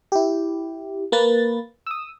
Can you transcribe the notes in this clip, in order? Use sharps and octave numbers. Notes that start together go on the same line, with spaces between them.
E4 G4
A#3 B4 A6
D#6 E6